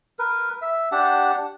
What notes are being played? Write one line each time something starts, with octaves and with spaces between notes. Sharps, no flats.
A#4 B4
E5
D4 G4 F#5 A5